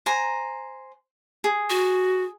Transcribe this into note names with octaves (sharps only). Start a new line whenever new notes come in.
C5 G#5 A#5
G#4
F#4